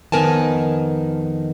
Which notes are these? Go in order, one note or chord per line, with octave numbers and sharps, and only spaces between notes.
F2 D#3 B3 A#4 G#5 A5